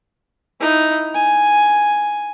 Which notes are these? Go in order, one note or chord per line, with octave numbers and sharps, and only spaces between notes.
D#4 E4
G#5